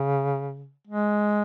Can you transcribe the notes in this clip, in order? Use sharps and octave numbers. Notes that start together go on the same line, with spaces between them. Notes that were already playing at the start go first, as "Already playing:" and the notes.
Already playing: C#3
G#3